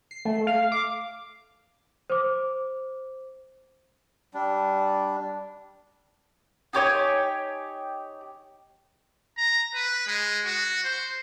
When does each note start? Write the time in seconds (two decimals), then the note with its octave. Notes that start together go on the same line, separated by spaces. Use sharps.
0.11 C7
0.25 A3
0.47 F5
0.72 D6
2.10 C5 D6
4.34 G3 D4
6.73 D#4 G4 C#5 G#5
9.37 A#5
9.74 B4
10.07 G#3
10.45 F#4
10.84 C5